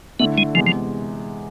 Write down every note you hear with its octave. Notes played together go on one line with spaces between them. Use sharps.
D3 A3 B3 E4
G#3
E2 C3 F3 G#3
F3